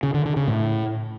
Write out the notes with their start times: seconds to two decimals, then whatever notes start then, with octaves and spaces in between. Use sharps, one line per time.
0.03 C#3
0.14 D3
0.25 D3
0.36 C#3
0.48 A2